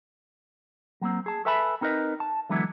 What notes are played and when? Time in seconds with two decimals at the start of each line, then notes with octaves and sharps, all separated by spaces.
1.01 F#3 A#3 C4
1.26 G#4 A5
1.45 A4 B4 E5 G#5 A5 B5
1.81 C4 D#4 A#4 B4 D#5
2.20 A5
2.50 D3 E3 F#3 G#3 B3 E4